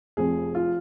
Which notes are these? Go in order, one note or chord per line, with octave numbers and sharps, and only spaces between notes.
F1 F2 F3 G#4
F4